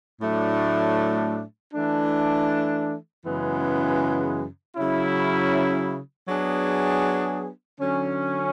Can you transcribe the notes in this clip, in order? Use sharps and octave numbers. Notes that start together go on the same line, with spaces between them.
A2 F#3 A3 D4
E3 A3 D4
F#2 C#3 E3 G#3 B3
C#3 F#3 C#4 E4
F#3 B3 D4 G#4
D3 F#3 C#4